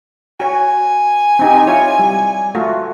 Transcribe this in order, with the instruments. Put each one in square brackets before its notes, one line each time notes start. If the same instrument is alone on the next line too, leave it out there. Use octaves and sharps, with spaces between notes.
[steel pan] F#4 C#5 [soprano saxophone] G#5
[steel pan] C4 D#4 G4
E4 F4 C#5
G3
A3 F4 F#4